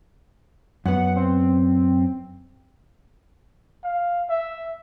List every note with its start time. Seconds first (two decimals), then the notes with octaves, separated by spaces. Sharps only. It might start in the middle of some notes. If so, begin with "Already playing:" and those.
0.86 F#2 B3 F#5
1.16 C4
3.84 F5
4.30 E5